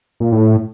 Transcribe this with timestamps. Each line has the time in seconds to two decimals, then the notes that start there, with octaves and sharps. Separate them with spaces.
0.20 A#2
0.32 A2